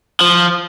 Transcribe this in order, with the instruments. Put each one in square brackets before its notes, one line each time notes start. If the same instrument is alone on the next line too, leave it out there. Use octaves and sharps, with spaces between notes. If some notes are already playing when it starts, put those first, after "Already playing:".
[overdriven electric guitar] F3